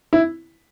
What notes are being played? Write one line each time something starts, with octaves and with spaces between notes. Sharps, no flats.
E4